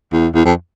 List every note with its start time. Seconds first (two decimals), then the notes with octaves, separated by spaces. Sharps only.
0.12 E2
0.34 E2
0.45 F2